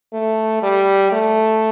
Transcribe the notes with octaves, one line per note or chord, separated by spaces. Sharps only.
A3
G3
A3